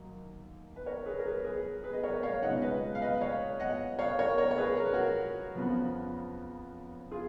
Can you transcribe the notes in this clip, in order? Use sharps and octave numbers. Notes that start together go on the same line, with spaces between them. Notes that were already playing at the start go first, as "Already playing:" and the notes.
Already playing: D#2 F#3 A#3
B4
A#4 C#5
G#4 B4
A#4
G#4 B4
G#4 B4
G#4 B4
D#5
A#4 C#5
C#5 F5
C#2 B2 G#3 D#4 D#5 F#5
B4 D#5
F5
B4 D#5
C#5 F5
D#5 F#5
C#5 F5
A#4 C#5
A#4 C#5
C#5
G#4 B4
A#4
B4
F#4 A#4
F2 C#3 F3 B3
F4 G#4